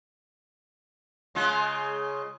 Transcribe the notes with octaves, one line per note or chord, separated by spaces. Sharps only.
C#3 G#3 F4